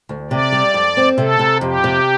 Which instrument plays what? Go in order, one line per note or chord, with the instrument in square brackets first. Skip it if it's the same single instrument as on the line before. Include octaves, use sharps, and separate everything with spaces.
[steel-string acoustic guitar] D2
[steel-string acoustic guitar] C3 [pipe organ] D5
[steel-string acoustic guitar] G3
F2
C4
[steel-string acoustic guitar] C3 [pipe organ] A4
[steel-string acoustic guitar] C3
[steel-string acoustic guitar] F2 [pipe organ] G4
[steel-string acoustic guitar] C3